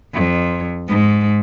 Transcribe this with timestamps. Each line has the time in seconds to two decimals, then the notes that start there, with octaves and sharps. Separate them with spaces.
0.13 F2
0.88 G#2